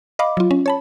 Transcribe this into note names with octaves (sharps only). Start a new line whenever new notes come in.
D#5 F5 B5 D6
F#3 F4
C#4
C#5 A5 B5